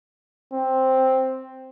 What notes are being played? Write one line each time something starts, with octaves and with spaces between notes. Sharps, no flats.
C4